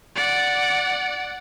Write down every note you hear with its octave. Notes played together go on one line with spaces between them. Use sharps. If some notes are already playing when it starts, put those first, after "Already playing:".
D5 F#5